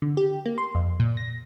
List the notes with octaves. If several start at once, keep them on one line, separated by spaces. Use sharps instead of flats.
D3
G4
A#3
C6
F2
A#2
A#6